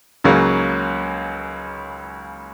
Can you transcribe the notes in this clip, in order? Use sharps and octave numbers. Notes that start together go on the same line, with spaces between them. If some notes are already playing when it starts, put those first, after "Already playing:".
C#2 C#3 F#3 A#3